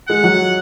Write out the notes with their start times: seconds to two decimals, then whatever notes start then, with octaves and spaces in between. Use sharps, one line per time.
0.08 G#3 F#5
0.23 F#3